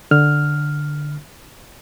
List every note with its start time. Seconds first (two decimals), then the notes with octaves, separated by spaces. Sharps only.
0.11 D3 F6